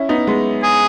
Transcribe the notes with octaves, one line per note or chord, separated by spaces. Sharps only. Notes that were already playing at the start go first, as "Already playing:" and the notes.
Already playing: C#4 E4
B3 D#4
G#3 B3
G#4